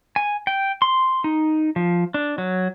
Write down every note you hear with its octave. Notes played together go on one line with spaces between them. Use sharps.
G#5
G5
C6
D#4
F3
D4
F#3